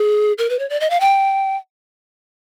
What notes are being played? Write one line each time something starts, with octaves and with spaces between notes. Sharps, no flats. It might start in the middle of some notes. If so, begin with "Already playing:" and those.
Already playing: G#4
A#4
B4
C#5
D5
D#5
F5
G5